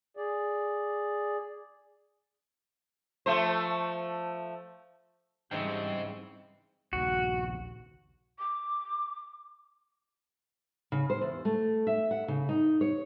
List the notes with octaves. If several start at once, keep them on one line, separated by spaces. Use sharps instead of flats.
G#4 D5
F3 A3 C5
G#2 C#3 E3 G3 C4 C5 D#5 G5
A#1 D#2 F#4
D6
C#3
C5
E2
A3
E5
F#5
C#3
D#4
C#5